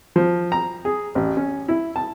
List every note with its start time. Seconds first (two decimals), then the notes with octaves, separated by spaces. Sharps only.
0.16 F3
0.52 A#5
0.85 G#4
1.15 A1
1.37 C#4
1.68 E4
1.96 A5